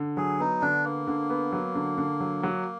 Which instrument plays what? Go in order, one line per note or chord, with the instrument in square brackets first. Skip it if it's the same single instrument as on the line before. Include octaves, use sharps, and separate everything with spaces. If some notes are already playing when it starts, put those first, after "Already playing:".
Already playing: [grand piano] D3
[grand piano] F#3 [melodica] G#4
[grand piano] B3 [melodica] D#4
[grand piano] D3 [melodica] D4
[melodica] A#3 [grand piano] B3
[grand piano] D3
B3
F#3
D3
D3
F#3
F#3